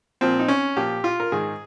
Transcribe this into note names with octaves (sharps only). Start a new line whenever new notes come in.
A#2 F3 C4
D#4
C#4
A#2 F3 G4
F4
A#4
G#2 D#3 G#4